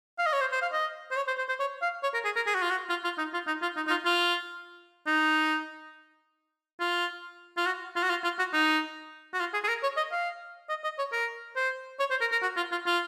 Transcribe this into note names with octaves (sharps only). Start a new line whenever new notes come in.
F5
D#5
C#5
C5
C5
F5
D#5
C5
C#5
C5
C5
C5
C#5
F5
C#5
A#4
G#4
A#4
G#4
F#4
F4
F#4
F4
F4
D#4
F4
D#4
F4
D#4
D#4
F4
F4
D#4
F4
F4
F#4
F4
F#4
F4
F4
F#4
D#4
F#4
F4
G#4
G#4
A#4
C#5
D#5
F5
D#5
D#5
C#5
A#4
C5
C#5
C5
A#4
A#4
F#4
F4
F4
F4